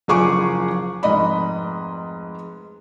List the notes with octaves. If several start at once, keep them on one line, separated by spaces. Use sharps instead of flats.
F#1 F3 G#4 C#6 D6
F1 G#2 D#5 B5